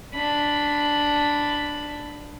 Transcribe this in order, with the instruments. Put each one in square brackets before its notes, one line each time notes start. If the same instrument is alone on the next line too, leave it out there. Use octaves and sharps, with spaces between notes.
[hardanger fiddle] D4 B5